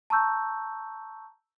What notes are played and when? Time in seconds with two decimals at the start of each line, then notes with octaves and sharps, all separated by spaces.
0.10 A5 A#5 C#6 E6 G6